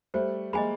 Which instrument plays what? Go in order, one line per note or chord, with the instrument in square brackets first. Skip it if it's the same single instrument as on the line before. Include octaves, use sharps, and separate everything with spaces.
[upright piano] G3 A3 [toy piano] C5
[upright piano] G#3 A#3 [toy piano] D#5 G#5 B5